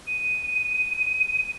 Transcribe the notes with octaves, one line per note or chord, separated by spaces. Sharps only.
D#7